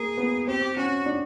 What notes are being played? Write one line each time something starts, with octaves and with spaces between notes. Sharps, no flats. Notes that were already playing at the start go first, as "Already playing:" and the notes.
Already playing: A#3 G#4
B3
C4 G4
C#4 F#4
D4